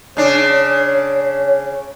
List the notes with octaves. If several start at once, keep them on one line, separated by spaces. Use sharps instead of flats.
C#3 D4 C#5